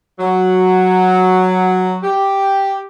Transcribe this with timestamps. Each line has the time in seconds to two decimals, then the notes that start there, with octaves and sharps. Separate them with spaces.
0.20 F#3
2.03 G4